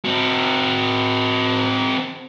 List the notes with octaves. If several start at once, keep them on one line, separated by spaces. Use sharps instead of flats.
C4 F#4